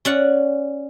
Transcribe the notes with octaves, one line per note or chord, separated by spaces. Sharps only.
C#4 D5 F#5